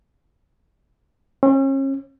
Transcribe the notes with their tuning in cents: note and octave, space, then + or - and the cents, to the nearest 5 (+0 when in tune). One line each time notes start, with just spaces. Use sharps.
C#4 -35